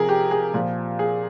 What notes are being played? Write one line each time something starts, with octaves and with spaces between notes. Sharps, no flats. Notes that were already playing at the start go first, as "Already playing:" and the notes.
Already playing: C3 F3 G#4 A#4
G4
G#4
A#2 F3
G#4